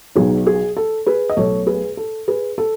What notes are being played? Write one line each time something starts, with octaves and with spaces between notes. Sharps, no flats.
B1 B2 F#3 B3 D#4 G#4
G#4
A4
G#4 B4
D#5
B1 B2 A3 A4 C#5
G#4 B4
A4
G#4 B4
A4